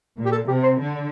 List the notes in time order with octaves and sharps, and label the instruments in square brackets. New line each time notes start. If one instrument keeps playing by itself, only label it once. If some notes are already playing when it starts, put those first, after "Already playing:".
[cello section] A#2
[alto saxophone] G4
A4
[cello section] C3 [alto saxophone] G4
[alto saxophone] C5
[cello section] D3